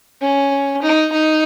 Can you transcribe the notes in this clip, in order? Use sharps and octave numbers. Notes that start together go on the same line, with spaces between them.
C#4
D#4
D#4